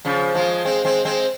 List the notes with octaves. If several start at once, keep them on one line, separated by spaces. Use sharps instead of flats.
C#3 F3
F3 G#3
G#3 C4
G#3 C4
G#3 C4